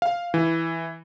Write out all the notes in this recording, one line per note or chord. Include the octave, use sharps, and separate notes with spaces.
F5
E3